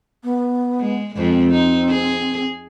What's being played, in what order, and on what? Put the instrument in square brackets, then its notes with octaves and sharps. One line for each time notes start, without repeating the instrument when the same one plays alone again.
[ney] B3
[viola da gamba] G#3
[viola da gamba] F2 G#3 [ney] C4
[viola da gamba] D#4
G#4